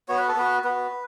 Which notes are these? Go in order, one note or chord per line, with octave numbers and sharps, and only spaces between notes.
B3 F#4 C#5
B4
A4
B3 F#4 B4
B3 F#4 B4